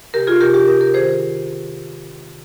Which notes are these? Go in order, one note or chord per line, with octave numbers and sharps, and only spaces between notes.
C3 G4 A#4
F4 G#4
C3 G4 A#4
G4
C3 G4 A#4
G4 A#4
D#3 G#4 C5